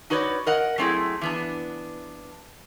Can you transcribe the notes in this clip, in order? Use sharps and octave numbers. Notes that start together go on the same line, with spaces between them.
D#4 F#4 B4 C#5 D5
A#4 D#5 F#5
F#3 A3 C4 E4 G#4
E3 B3 D4